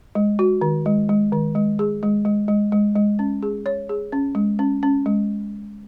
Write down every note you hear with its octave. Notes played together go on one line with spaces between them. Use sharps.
G#3
F#4
D#3
G#3
G#3
D#3
G#3
G#4
G#3
G#3
G#3
G#3
G#3
C#4
G#4
C#5
G#4
C#4
G#3
C#4
C#4
G#3